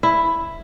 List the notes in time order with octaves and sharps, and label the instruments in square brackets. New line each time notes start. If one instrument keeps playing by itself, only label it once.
[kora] E4